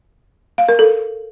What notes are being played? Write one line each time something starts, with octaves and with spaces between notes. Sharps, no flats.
F5
A#4
A4